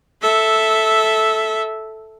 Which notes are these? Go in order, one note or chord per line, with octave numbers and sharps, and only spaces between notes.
A4 E5